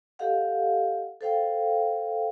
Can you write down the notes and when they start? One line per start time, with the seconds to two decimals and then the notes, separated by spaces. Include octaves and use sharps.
0.19 G4 A4 D#5 F5 F#5
1.21 A4 C5 F5 G5